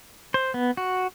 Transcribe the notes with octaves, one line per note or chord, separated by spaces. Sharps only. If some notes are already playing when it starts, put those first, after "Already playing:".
C5
B3
F#4